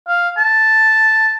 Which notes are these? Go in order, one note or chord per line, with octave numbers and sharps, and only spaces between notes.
F5
A5